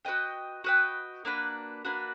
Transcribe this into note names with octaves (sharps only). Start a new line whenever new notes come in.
F#4 B4 D#5 G5
F#4 B4 D#5 G5
A#3 D4 F#4 B4
A#3 D4 F#4 B4